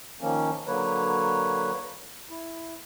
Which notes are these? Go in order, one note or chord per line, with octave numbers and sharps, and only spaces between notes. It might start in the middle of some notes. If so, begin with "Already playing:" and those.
D#3 F3 A#3 C#4
D3 F#3 A#3 B4 C#5
E4